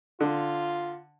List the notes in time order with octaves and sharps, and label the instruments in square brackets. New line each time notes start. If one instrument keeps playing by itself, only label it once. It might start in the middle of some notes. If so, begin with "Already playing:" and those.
[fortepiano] D3 [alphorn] F4